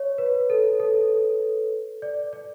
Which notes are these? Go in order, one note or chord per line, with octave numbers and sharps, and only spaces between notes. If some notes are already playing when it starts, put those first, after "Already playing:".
Already playing: C#5
B4
A4
A4
D5
D5